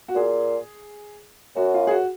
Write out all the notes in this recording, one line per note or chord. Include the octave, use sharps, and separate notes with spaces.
F#4
A#2 G#4
F#2 F#4
F4
G#4
F#4